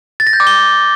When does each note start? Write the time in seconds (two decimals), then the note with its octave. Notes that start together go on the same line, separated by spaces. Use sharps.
0.20 A6
0.27 A#6
0.33 G6
0.40 D6
0.47 G7